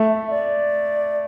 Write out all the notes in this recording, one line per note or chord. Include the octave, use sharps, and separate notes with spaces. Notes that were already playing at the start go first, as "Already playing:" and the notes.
Already playing: A3
E5
D5